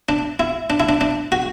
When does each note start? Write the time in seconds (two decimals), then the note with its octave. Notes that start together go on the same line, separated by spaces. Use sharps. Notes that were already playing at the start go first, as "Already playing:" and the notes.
0.09 D4
0.40 E4
0.70 D4
0.80 E4
0.89 D4
1.01 D4
1.32 F#4